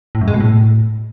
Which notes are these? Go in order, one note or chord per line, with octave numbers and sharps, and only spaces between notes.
A2
F#2
G#3
B2
A2